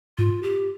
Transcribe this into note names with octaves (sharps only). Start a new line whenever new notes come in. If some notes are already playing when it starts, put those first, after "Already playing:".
G#2 F4
G4